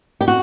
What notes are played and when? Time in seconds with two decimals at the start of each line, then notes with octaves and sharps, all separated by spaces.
0.21 G4
0.28 F#4